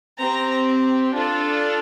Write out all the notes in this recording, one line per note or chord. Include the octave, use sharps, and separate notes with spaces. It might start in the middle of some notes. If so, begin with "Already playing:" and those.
C4 G4 A#5
D4 F4 A4